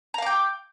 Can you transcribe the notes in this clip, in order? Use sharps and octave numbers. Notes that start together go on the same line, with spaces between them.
F5 G5 A#5 D6